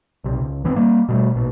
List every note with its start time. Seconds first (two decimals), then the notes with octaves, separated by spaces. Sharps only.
0.24 B1 C3
0.41 C#2
0.64 G#1 E3 B3 C4
0.76 G3 A#3
1.09 B2 G3 A3
1.35 A#1 B2